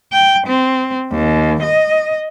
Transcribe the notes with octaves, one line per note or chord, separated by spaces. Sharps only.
G5
C4
D#2
D#5